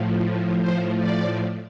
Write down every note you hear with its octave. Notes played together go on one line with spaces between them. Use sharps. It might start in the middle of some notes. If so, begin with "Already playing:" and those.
Already playing: A2 F3
A2 F3 C5
D5